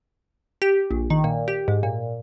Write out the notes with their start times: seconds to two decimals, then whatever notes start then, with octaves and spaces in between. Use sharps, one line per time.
0.62 G4
0.91 A#1
1.10 D#3
1.24 A#2
1.48 G4
1.68 G#2
1.83 A#2